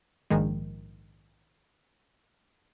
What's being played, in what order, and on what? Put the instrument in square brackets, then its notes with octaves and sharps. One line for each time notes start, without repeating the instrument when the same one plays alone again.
[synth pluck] A#1 G#2 D#3 G#3